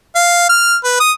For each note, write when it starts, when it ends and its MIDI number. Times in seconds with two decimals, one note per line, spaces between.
0.15 0.47 77
0.49 0.76 89
0.84 1.00 71
1.00 1.12 87